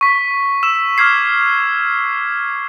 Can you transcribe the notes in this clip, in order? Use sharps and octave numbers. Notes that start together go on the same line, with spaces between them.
C#6 B6
E6 E7
D6 F6 G#6 C7